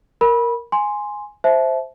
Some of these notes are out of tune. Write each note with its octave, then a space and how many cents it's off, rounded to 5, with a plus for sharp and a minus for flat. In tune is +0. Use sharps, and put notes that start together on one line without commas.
A#4 +0 B5 -20
G#5 +0 C6 +0
C5 +0 E5 +0 A5 -30